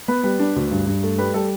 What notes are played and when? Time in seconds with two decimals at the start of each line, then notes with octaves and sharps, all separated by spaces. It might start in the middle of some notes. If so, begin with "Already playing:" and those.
0.08 B3 B4
0.23 G3 B4
0.39 D4
0.56 D2
0.71 G2
0.86 G2
1.03 A3
1.18 G3 B4
1.34 G3 A4